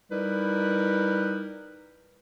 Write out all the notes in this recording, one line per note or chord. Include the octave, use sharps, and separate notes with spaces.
G3 D#4 E4 A#4 B4